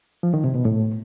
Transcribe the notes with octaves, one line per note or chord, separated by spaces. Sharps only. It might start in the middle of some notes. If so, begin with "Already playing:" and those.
F3
D#3
C3
B2
A2